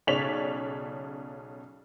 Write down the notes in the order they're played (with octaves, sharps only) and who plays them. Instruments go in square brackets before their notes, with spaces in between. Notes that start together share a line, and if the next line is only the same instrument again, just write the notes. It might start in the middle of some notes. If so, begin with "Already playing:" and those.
[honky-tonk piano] B1 C#3 C#5 D5 B6 F7